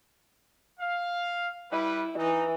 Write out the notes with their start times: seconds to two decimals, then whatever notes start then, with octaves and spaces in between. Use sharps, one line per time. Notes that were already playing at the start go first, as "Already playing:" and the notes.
0.80 F5
1.72 G3 E4 B4
2.18 E3 D#4